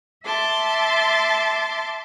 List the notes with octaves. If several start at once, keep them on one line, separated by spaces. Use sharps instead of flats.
E5 A5 C6 D6